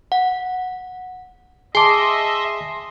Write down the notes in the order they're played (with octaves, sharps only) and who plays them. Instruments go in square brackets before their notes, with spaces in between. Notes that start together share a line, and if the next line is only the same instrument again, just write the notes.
[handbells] F#5
[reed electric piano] G#4 D6 [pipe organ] D#5 E5 [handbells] G#5 A5 [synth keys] C6